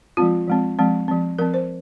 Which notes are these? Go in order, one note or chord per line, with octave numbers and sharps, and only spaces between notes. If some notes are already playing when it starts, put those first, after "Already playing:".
F3 G#3 C4 F4
F3 G#3 C4
F3 G#3 C4
F3 C4
F3 C4 A#4
C5